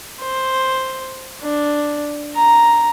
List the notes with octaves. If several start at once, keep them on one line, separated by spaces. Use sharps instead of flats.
C5
D4
A#5